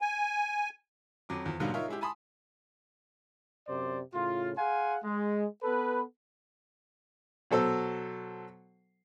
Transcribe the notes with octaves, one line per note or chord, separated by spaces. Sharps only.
G#5
F2 F#3 D6
E2 F3
G#2 B2 D3 F#3 G3 A#3
D#4 F4 A#4 C#5 E5
G#3 E4 G4
G#5 A5 B5 C6 D#6
F#2 C3 C5 D5
A2 C#3 F4
G#4 F5 F#5 G#5 C6
G#3
B3 A4 B4
B2 F#3 A4 C5 E6